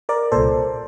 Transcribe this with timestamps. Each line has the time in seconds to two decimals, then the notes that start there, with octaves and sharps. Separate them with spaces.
0.09 A#4 D5
0.32 C2 A#2 A4 C5